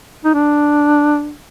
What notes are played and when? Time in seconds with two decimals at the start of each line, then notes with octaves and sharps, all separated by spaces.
0.25 D#4
0.34 D4